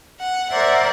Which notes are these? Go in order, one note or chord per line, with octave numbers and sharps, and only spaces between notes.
F#5
A#4 C5 D5 E5 F#5